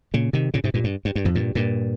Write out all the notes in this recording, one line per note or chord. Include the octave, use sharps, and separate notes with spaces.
A#2 C#3
C3 D#3
A#2 C#3
G#2 C3
G2 A#2
G2
G2
G2
F2 G#2
G2 A#2
G2 A#2